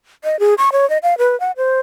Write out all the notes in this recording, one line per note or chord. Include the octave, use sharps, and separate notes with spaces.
D#5
G#4
C#6
C#5
D#5
F5
B4
F#5
C5